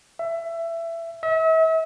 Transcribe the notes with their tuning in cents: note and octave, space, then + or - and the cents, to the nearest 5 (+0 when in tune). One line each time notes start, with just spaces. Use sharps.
E5 +20
E5 -40